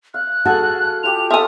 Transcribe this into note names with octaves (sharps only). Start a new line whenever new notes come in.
F5 F#6
F#4 G#4 A4 A5
F4 G4 D#6 F7
F4 A4 A#4 E5 G#5 D#6